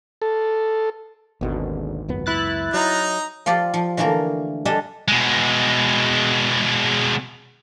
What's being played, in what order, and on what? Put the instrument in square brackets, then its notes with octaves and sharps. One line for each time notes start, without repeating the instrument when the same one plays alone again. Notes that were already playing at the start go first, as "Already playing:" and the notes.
[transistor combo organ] A4
[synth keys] G#1 [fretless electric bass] D#2 B2 D3
[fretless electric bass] C#2 F#2 B3
[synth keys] E4 F#6 A6
[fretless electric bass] F#3 [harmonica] D#4 A#5
[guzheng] F3 F4 G4 D5
F3
D3 E3 A3 A#3 A#4
G3 D4 G#4 A4 D#5 E5
[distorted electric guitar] B2 G#3